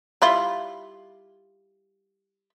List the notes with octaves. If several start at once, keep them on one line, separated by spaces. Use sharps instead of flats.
G3 E4 F4